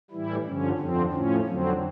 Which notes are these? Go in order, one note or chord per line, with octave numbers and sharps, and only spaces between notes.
A2 E3 G3 E4
G2 D3 F3 C#4
F2 D3 F3 C4
A2 F3 C#4
F2 D3 F#3 C4